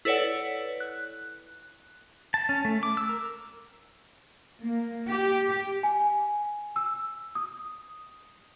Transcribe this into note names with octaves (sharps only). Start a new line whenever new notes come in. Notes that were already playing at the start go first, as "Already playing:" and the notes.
E4 A4 B4 C#5 D5 F#5
F#6
A5
C#4
A3
D6
E6
A#4
A#3
G4
G#5
E6
D#6